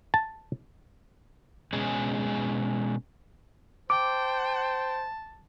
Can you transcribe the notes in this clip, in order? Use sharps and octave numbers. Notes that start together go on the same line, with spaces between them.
A5
B2 G#3 C#4 G#4
C5 G5 A5 D6